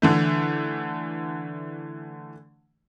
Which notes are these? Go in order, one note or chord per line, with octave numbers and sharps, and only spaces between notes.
D3 E3 A3